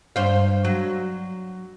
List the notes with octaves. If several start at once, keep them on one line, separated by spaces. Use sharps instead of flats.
G2 C5 F5
F#3